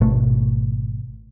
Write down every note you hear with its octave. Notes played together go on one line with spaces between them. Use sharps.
G#1 B2 A3